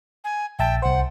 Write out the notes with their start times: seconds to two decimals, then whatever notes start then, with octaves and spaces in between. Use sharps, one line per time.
0.24 G#5
0.59 A#1 E5 G5 A5
0.82 C2 C5 F#5